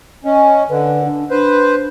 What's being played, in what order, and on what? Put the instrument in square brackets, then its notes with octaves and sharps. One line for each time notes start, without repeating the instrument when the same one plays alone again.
[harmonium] C#4 [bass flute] D#5
[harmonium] D3 [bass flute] B4
[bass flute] D4
[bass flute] D4 [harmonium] B4 C5